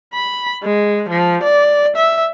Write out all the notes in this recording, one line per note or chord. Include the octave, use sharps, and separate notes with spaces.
B5
G#3
F3
D5
E5